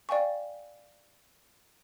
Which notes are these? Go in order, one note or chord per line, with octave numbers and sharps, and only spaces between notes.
D5 F5 G5 G#5 C#6